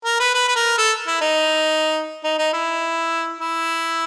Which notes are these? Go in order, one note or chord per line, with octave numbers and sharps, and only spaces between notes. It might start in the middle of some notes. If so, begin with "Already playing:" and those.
A#4
B4
B4
B4
A#4
A4
E4
D#4
D#4
D#4
E4
E4